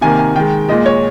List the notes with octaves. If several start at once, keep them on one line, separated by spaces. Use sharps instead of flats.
C3 D#3 A#3 G#5
G#5
D#3 G#3 G5
A#2 G#3 D#5
C#5